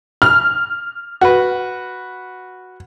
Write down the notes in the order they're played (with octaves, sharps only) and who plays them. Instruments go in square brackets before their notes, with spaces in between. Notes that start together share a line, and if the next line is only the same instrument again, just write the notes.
[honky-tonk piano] F6
[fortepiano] F#4 B4